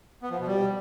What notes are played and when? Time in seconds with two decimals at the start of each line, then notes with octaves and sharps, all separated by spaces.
0.23 B3
0.31 F3
0.39 B2
0.47 G3